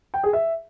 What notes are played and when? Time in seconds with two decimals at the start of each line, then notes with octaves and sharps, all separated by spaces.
0.14 G5
0.23 G#4
0.33 E5